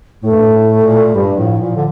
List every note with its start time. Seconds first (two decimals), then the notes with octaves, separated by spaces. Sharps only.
0.23 A2 A3
0.31 G2
0.40 A2
0.53 A2
0.84 A#2
1.14 G2 G3
1.37 A2 F3
1.60 A#2 F3
1.76 D3